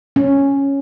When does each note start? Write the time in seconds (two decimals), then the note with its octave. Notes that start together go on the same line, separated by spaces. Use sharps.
0.16 C#4